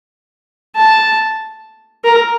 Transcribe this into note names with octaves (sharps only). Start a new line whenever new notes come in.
A5
A#4